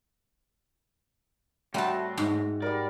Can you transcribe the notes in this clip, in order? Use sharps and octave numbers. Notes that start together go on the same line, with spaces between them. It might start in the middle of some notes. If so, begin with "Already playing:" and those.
A2 G3 A3 C4 F#4 A5
G#2
G3 A#4 D5